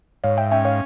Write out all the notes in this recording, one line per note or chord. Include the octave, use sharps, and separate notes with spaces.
G#2 C#5 F5
E5 G5
C#4 E5 G5
C#5 F5